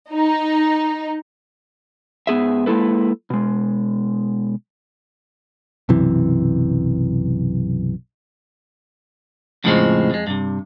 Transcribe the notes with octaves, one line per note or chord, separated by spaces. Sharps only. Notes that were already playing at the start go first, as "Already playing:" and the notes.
D#4
G#2 B3 G#4 E5
G#3 A#3 E4 A4 B4
B2 G#3
B1 F#2 C3 E3
F2 A2 C#3 F3 G#3 C4
F2 G#3
G2 C3